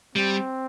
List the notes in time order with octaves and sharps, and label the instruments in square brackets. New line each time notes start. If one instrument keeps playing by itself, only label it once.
[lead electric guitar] G3 [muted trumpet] C4